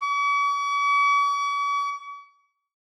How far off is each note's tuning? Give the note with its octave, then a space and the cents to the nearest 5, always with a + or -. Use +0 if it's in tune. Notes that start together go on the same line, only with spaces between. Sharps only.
C#6 +45